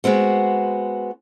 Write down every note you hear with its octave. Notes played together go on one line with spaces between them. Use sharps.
G#3 B3 C4 F#4